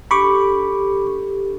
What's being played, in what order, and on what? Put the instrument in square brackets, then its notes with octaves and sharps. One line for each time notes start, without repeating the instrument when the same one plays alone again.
[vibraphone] D4 G4 A4 [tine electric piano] B5 C#6 D6